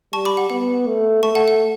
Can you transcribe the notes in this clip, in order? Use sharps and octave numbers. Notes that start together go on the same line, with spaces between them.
G3 A5 C#6
B5 D6
F#5
B3 F#5
A3
A3 A5 C#6
F#5 A5
F#5